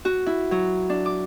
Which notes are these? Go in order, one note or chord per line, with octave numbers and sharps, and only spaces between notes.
F#4
E4
F#3
D4
D6